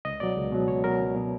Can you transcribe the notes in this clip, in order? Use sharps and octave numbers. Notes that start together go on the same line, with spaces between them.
C#2 D#5
B2 F#3 D5
C#2
B2 F#3
C#2 C#5
B2 F#3 A#4
C#2
B2 F#3